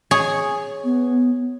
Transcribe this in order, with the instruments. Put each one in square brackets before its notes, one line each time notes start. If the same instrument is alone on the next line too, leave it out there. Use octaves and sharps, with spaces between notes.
[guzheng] G#4 C#5
[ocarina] B3